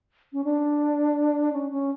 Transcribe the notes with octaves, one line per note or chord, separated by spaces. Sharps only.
C#4
D4
C#4
C#4